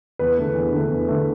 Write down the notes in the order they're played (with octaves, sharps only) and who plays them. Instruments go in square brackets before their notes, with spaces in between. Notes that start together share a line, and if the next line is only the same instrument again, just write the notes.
[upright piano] E2 B4
D3 A3
E2
D3 A3
E2
D3 A3